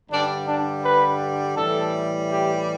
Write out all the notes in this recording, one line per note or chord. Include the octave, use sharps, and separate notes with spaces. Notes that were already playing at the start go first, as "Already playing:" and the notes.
G2 D3 G3 D4
D4
B4
A2 E3 G3 A4
G4